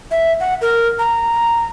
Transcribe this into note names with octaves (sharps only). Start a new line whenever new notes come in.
E5
F#5
A#4
A#5